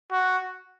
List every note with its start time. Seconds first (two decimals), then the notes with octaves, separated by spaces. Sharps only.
0.11 F#4